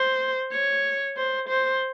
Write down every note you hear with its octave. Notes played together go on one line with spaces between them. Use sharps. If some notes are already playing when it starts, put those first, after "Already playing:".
Already playing: C5
C#5
C5
C5